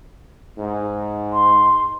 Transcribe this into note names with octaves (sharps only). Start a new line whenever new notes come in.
G#2
C6